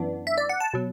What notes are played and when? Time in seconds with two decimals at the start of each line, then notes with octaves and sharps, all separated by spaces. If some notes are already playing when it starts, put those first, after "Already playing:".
Already playing: F#2 E3 B3 D4
0.27 E5
0.38 D5
0.49 F#5
0.60 A5
0.74 B2 F#3